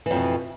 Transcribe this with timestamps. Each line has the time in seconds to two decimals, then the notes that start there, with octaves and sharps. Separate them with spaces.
0.06 E3
0.11 F2
0.16 B2